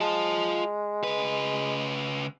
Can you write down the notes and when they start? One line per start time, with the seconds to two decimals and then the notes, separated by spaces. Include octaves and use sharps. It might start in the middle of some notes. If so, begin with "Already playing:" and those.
0.01 G#3 F4 A5
1.03 C#3 B4